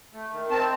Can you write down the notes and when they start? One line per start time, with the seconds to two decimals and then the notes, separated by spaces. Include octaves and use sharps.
0.13 A3
0.32 D#3
0.51 C4 A5